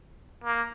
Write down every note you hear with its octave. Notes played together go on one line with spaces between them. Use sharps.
A#3